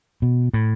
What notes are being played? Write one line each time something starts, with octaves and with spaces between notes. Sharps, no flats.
B2
A2